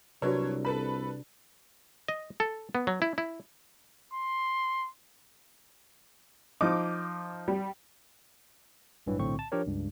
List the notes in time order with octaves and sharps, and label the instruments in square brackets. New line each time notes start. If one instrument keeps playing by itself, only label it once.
[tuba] C2 [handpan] C3 D4 [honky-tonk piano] F#3 A#4 C#5 [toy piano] F#4 B4
[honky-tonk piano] A4 B4 B5 [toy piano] A#5
[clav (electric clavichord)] D#5
A4
B3
F#3
E4
E4
[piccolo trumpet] C6
[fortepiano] F3 D#4 [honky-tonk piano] D6
[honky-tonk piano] G3
[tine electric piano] A1 G2 E3 F#3
B1 A2 D3 C4 C#6
A5
F3 D4 G4 A#4 C#5
C#2 G2